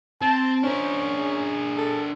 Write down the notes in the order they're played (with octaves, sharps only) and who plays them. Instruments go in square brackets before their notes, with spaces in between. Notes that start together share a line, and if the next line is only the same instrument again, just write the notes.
[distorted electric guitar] C4 [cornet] A5
[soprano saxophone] C#4 [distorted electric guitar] D4 A#4 [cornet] C5
[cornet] G#4
[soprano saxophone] A4